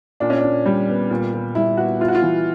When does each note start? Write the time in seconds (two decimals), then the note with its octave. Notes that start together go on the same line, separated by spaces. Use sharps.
0.20 A#2 D4
0.30 C#4
0.38 D4
0.44 A#2
0.66 G3
0.88 B3
1.10 A#2
1.34 A#2
1.55 G3 E4
1.77 B3 F#4
2.00 E4 F4
2.08 F#4
2.15 F4
2.22 E3